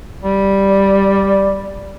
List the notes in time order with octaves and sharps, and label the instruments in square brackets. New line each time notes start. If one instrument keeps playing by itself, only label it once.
[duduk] G3
[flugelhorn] D5